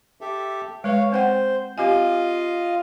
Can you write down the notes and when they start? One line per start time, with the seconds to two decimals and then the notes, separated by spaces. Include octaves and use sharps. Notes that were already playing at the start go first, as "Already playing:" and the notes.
0.21 G4 A4 E5
0.84 G#3 B4 C#5 F5
1.12 C4 C5 F#5 G5
1.78 C4 F4 G4 D#5 F5 G#5